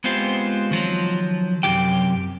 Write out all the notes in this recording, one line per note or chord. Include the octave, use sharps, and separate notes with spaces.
G#3 B3 C4 F4 G4 C5
D#3 F3 F#3
F#2 C3 G#3 E4 G4 G5